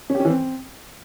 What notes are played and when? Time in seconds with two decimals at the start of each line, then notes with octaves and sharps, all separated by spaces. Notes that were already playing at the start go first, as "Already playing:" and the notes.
0.10 C#4
0.15 G4
0.20 C#4
0.25 E3
0.30 C4